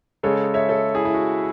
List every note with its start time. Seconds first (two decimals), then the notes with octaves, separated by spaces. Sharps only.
0.23 C#3 G#3 A4 C#5
0.54 C#5 E5
0.69 A4 C#5
0.94 E4 G#4
1.05 E4
1.14 F#4